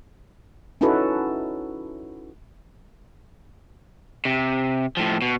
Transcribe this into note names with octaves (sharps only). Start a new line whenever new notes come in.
C#4 D#4 E4 F#4 A4 B4
C3
A2 F3
B2